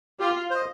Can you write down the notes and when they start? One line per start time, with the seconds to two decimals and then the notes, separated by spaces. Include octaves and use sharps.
0.20 F4 G4
0.51 C5 D#5